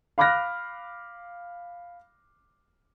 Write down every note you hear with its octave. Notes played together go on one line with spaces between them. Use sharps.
F5 B5 D6 F6 F#6 A#6